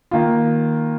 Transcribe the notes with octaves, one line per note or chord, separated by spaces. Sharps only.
D#3 A#3 F4